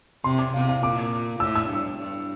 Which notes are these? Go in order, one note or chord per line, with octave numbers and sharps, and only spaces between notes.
C3 C6
D6
C3 F5
F5
A#2 D6
A2 E6
E6
G2
G2